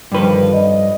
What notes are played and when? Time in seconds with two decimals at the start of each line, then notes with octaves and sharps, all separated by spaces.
0.12 G2 D3 D#3 F3 B4
0.53 F2 D5 D#5